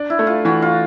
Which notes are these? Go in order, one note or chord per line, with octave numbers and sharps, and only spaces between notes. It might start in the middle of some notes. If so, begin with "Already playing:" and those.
Already playing: D4
E4
A3
F4
E3 F#4
F4